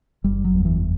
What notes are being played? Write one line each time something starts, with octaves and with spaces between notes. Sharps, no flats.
F#1 G3
F#3
E2
E3